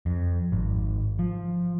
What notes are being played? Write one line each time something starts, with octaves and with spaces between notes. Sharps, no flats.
F2
G#1
F3